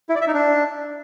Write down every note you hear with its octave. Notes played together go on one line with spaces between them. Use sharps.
E4
D5
E5
D#4
D4